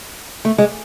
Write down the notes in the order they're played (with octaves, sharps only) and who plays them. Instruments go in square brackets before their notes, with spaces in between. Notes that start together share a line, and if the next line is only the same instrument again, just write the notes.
[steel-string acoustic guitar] A3
G#3